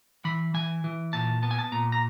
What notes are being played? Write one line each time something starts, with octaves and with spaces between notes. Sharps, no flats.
E3 B5
E3 G#5
E3
A#2 A5
B3 A5
G#5
A5
A#2 A#5
A#5